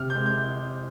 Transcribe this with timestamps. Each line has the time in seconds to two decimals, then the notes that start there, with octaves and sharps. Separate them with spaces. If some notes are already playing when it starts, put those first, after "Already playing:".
Already playing: C3 F6
0.10 G6
0.15 G#3
0.26 G6